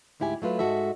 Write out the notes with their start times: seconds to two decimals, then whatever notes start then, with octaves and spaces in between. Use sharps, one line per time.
0.20 D2 G#2 E4 G4 G#5
0.42 F#3 A3 F4 B4
0.59 G#2 G#3 F#4 A4 E5